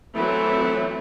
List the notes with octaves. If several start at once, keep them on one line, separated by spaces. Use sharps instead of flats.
E3 F#3 A3 C4 E4